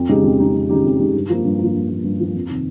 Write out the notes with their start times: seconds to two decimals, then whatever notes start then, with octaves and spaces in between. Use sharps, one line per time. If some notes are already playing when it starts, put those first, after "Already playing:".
Already playing: F2
0.09 C#3 G#3 D#4 G4
0.23 F2
0.38 C#3 G#3 D#4 G4
0.54 F2
0.69 C#3 G#3 D#4 G4
0.84 F2
0.99 C#3 G#3 D#4 G4
1.15 G2
1.29 F3 A#3
1.45 G2
1.59 F3 A#3
1.74 G2
1.90 F3 A#3
2.04 G2
2.20 F3 A#3
2.34 F2
2.49 C3 D#3